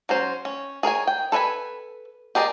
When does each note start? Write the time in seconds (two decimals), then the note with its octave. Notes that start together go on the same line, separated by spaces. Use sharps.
0.09 F#3 C#4 C5
0.45 C#4
0.83 G#4 A#4 C#5 G#5
1.07 G5
1.32 A4 B4 C#5 G#5 B5
2.35 G4 G#4 A#4 D5 D#5